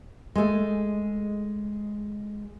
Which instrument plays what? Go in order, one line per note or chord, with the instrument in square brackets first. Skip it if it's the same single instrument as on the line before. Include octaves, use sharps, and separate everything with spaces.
[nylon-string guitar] G#3 A3